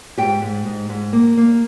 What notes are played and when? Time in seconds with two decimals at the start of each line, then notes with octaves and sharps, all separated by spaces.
0.18 G#2 G4 G5
0.42 G#2
0.65 G#2
0.89 G#2
1.13 A#3
1.37 A#3